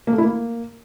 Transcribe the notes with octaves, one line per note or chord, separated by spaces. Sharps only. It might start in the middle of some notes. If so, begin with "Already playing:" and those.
A#3
A3
E4
A#3